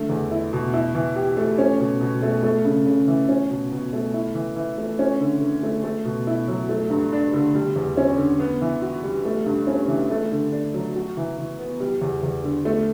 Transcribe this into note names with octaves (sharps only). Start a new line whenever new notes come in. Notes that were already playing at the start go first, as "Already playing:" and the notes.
Already playing: D3 A3
E2
E4
B2
E4
E3
G4
A3
C#4
B2
B2
A3
A3
C#3
C#3
E3
C#4
B2
B2
A3
E4
E3
E3
A3
C#4
D3
D3
A3
A3
B2
E4
F#3
A3
G2
D4
D3
G3
E2
C#4
D3
B3
E3
F#4
G3
A3
G2
C#4
E3
A3
D3
D4
F#3
F#4
E3
E3
B3
G3
E2
E2
D3
A3